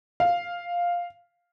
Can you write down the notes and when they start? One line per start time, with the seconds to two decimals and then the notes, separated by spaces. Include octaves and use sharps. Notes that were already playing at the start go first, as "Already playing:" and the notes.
0.20 F5